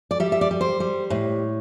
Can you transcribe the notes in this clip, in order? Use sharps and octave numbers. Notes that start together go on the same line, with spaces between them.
D5
G3 E5
E5
D5
G3
C5
G3
A2